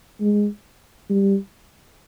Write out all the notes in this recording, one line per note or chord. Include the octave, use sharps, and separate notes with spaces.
G#3
G3